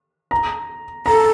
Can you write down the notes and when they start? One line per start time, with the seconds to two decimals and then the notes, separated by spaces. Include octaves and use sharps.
0.31 A#5
1.06 A4 A#5